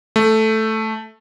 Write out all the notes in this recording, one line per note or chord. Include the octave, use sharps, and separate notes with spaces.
A3